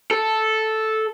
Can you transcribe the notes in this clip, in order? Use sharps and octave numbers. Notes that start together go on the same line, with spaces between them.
A4